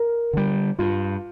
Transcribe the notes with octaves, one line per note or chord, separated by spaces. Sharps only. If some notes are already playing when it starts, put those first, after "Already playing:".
Already playing: A#4
D3 G3
G2 F4